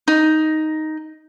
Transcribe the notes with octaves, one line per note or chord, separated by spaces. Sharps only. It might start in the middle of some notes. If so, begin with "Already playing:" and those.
D#4